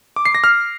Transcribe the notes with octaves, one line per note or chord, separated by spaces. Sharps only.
D6
C7
A#6
F6